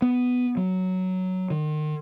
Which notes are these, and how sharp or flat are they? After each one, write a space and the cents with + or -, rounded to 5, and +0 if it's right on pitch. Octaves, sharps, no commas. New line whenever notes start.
B3 +5
F#3 +5
D#3 -35